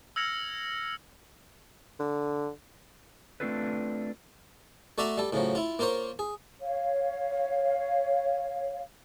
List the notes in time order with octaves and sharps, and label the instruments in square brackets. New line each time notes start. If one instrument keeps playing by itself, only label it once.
[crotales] E6 F6 G#6 A#6 C#7 F7
[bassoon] D3
[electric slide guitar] A3 C4 D4 F4 A4 B4
[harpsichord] A3 F#4 D5 E5 A#5 C6
G3 A4
A2 C#3 F3 F#3
E4 F4
A#3 F4 A#4 C5 C#5
G#4
[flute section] C#5 F5